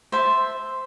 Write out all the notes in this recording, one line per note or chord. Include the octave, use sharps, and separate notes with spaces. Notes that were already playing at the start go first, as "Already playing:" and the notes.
C5 E5 A5